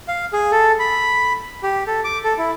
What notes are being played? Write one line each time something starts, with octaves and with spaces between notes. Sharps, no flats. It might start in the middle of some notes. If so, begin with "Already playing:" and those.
F5
G#4
A4
B5
G4
A4
D6
A4
E4